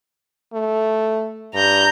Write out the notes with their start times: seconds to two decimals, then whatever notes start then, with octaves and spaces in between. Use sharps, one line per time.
0.54 A3
1.54 G2 A#5 G6